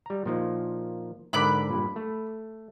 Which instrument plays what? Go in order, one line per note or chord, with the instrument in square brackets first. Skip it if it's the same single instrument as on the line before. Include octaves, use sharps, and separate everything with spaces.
[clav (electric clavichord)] G3 A#5
A#2 F3 D#4
[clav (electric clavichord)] G#2 D3 A#4 [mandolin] B5 D6 F#6
[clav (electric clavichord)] G2 A#2
A3